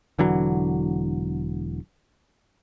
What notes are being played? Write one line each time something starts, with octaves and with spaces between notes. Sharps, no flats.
E1 D3 E3 F#3